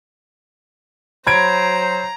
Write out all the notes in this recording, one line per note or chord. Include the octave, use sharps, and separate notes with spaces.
F#3 C5 A#5 B5 G#6 D7